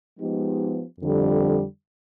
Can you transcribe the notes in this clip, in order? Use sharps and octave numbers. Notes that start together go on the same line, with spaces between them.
F3 G#3 B3 D#4 G4
F2 D3 G3